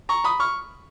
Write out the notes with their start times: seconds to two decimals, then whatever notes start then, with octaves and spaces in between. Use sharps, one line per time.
0.09 A#5 C#6
0.24 B5 D#6
0.40 C#6 F6